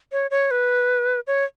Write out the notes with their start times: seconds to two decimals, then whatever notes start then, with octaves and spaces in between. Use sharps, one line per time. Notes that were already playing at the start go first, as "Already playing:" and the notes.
0.12 C#5
0.31 C#5
0.51 B4
1.27 C#5